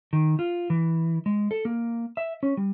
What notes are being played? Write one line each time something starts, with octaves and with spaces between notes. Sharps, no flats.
D#3
F4
E3
G#3
A4
A#3
E5
C#4
G3